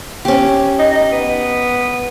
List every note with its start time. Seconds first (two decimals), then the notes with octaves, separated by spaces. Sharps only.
0.25 C#4 G4
0.79 D#4
0.92 D#4
1.12 B3